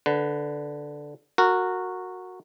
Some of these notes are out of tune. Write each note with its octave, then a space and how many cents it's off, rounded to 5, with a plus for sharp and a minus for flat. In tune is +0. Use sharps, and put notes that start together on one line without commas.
D3 +0 B4 +20
F#4 -10 A#4 -20